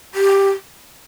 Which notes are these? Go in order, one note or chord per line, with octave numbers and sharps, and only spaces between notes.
G4